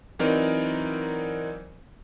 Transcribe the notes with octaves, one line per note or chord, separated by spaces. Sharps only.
E3 F#3 C4 D#4 A#4 D5